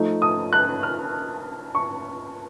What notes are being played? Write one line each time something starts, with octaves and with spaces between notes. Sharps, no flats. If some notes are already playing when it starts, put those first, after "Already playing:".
Already playing: F3 A3 D#4
D#6
F#6
F6
C#6